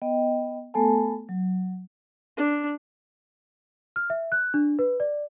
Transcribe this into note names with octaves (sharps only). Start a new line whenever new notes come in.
B3 D#5 G5
A3 B3 A4 G#5 A5
F#3
D4
F6
E5
F#6
D4
B4
D5